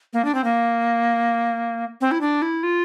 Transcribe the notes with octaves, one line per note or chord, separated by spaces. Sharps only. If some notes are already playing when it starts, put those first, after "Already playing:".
A#3
D4
C4
A#3
C4
E4
D4
E4
F4